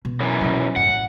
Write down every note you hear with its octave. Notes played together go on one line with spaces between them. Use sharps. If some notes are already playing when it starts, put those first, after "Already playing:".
B2
F#2 E3
B2 F#3
G2 F#3 F#5
A1